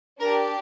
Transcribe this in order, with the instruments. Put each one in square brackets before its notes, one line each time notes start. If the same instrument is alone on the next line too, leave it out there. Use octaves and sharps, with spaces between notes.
[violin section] D4 G4 A#4